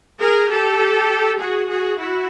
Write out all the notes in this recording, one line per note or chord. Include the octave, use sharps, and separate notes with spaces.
G#4 A#4
G4 A4
F#4 G#4
F#4 G#4
E4 F#4